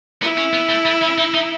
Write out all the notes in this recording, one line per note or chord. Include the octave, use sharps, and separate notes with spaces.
B3 E4
C#4
B3
A3
A3
C#4
D#4
D#4